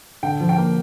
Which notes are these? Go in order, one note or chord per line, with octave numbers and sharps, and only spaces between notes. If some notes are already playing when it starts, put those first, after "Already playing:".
D3 G5
F3
G5
A#3